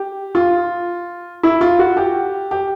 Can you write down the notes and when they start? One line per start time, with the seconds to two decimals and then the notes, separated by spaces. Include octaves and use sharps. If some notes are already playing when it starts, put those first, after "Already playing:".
Already playing: G4
0.35 F4
1.43 E4
1.61 F4
1.79 F#4
1.97 G4
2.51 G4